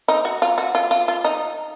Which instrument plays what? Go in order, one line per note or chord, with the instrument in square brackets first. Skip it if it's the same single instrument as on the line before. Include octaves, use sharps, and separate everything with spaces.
[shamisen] D#4
F#4
F4
F#4
F4
F4
F4
D#4